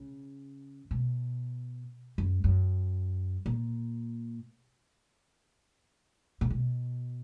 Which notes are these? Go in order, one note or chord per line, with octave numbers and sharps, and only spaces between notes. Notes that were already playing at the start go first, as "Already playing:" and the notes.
Already playing: C#3
B2
F#2
F#2
A#2
A#2
B2